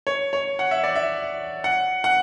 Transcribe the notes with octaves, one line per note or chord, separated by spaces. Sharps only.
C#5
C#5
F#5
E5
D5
E5
F#5
F#5